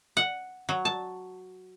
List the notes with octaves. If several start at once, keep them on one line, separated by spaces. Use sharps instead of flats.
F#5
F#3
A5